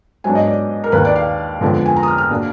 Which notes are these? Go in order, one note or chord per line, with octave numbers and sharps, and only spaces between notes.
G#2 F#3 B3 D4 G#5
D#5
D5
A#4
D#2 D#3 A#3 B4
D5
F5
F2 D3 G#3 B3
G#5
A#5
D#6
F6
F6
B2 A#3 D4